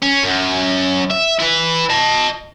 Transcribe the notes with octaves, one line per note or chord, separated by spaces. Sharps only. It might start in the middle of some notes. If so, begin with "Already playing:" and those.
C#4
F#2
E5
E4 B4
D#5 A5